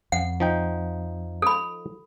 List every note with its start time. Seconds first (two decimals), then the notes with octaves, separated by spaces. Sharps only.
0.12 F2 F#5
0.40 F3 D#4 G5
1.42 A4 B5